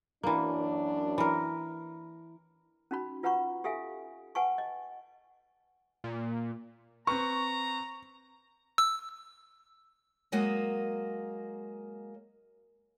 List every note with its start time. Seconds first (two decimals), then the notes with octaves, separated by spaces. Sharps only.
0.23 F#2 E3 A#3 D4
1.18 E3 A#4
2.91 C#4 D#4 F#4 B5
3.23 F4 B4 F#5 A#5 B5 C#6
3.64 G4 A4 E5 F5 G#5
4.35 B4 F#5 G#5 A5 C#6
4.58 D#5
6.04 A#2
7.07 C4 B4 A#5 C#6
8.78 E6
10.32 F#3 G#3 A#3 F#4 D#5